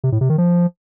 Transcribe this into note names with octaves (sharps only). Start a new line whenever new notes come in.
C3
A2
C3
D#3
F3